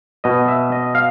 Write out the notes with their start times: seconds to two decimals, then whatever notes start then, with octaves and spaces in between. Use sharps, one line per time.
0.24 B2 D#5
0.48 E5
0.72 D#5
0.95 F5